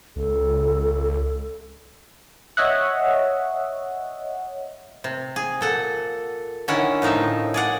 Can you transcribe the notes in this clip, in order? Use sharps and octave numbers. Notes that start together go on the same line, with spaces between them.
C#2 A4
C#5 D#5 E5 F#5
C3
G#4
A#2 A4 F#5
D3 D#3 C#4 E4 F#5
A2 F3 D#4 A#4 E5
G#4 D5 F#5